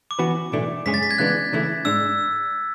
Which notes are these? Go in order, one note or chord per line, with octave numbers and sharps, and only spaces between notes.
D6
E3 B3 F#4 B4
B1 A2 E3 A3 D4
F#2 C#3 G#3 C#4 G#4 B6
A6
B6
G#6
C#3 E3 G#3 B3 D4 F#6
C#2 C#3 E3 A3 E4
G#2 G#3 D4 E6